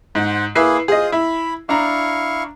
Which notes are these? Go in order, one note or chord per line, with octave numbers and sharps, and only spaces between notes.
G#2 C5 F#5
A#3 E4 G#4 B4 C7
F4 G#4 C5 D#5 D#6
E4 B5
D4 E4 F5 A#5 C#6